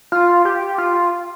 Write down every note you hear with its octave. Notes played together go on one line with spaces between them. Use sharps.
F4
G4
F4